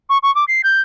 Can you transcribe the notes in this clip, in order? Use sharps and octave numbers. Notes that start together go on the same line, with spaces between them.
C#6
C#6
D6
C7
G6